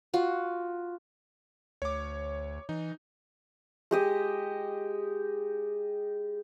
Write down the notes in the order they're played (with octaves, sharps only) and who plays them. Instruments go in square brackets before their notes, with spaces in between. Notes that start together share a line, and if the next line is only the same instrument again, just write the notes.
[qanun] F4 F#4
[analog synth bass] D2 [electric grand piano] C#5 D6
[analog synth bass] E3 [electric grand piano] D#4
[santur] G#3 G4 D#5